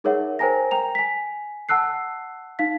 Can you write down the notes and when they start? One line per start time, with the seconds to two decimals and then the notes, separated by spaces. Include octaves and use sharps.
0.04 D#4 G#4 A#4 C#5 E5 F#5
0.39 A#4 C5 G5 G#5 A#5 A#6
0.71 G5 A#5 F7
0.95 G#5 B6
1.69 F#5 A5 E6 F#6 C7
2.59 D#4 F5 B6